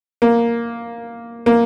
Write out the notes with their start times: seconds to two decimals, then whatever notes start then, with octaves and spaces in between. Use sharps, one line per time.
0.22 A#3
1.46 A#3